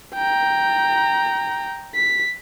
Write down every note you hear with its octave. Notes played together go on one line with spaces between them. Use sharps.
G5 A#5
B6